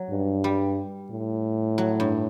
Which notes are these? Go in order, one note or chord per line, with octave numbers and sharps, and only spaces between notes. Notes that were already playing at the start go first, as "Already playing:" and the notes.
Already playing: F#3
G2
G3
A2
F#3
G2